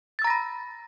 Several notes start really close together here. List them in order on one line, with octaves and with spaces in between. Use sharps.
A6 E6 A#5 A#6 B5